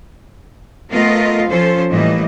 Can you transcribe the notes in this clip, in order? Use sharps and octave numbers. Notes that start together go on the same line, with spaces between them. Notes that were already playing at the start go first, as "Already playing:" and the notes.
A3 B3 F4 A#4 D#5 F5
F3 C#4 F4 A4 C5
A2 E3 G3 A#3 D#5